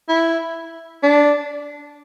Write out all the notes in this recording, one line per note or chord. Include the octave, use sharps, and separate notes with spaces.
E4
D4